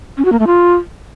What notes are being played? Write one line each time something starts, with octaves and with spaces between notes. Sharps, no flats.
C#4
F#4
A#3
A3
F4